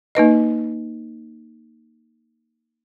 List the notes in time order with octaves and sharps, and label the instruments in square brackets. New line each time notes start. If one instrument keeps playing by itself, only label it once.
[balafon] A#3 D#4 B4 D#5